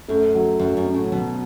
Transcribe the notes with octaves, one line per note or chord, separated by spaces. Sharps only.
F#2 A3
F#3
F#2 F#3
F#2
C#4
A2
B2 F#3